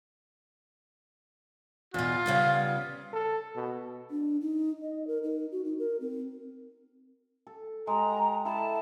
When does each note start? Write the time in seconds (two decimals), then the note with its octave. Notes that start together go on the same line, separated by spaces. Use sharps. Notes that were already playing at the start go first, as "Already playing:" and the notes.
1.94 E2 B2 F4
2.26 C#3 G3 B3
3.13 A4
3.56 B2
4.10 D4
4.41 D#4
4.82 D#5
5.07 A#4
5.23 D#4
5.52 F#4
5.65 D#4
5.79 A#4
6.01 C4
7.47 A4
7.87 G#3 G4 A#5
8.45 E4 A4 A5